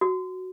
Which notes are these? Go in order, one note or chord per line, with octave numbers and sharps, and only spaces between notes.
F#4